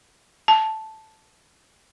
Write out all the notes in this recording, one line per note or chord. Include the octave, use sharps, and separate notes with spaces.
A5